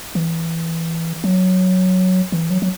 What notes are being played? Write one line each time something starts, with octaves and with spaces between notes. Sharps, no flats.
E3
F#3
E3
F#3
F#3